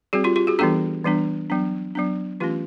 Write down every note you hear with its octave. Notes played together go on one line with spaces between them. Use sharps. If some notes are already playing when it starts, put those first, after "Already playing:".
G3 C4 F#4 G#4
F4 G4
F4 G4
F#4 G#4
E3 G3 B3 D4 G4 A4
E3 G3 B3 D4
F#3 B3 D4
F#3 B3 D4
E3 A3 C#4 F4 G4